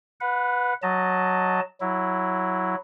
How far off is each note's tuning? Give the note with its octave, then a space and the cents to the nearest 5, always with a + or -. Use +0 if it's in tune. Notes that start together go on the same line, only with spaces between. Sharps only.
B4 +0 F#5 -25
F#3 +0 D#5 +0 A5 +0
F#3 +0 E4 +0